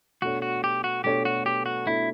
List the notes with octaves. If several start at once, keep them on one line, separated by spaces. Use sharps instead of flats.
B2 A3 D4 F#4 A4 C#5
F#4
G4
F#4
B2 A3 D4 G4 A4 C#5
F#4
G4
F#4
B2 A3 D4 E4 A4 C#5